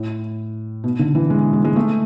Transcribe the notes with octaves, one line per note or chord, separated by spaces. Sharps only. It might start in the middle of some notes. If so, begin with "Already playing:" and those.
Already playing: A2
B2
D3
E3
G#3
G#3
G#3
A3